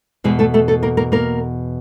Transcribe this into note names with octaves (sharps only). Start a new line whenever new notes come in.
E2 B2 G#3 G#4
A3 A4
A3 A4
A3 A4
A#3 A#4
A#3 A#4
A#3 A#4